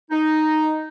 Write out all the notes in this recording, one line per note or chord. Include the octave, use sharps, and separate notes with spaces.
D#4